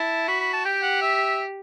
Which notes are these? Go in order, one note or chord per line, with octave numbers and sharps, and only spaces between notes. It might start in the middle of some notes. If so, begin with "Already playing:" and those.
Already playing: E4 A5
F#4 B5
B5
A5
G4 G5
F#5
E5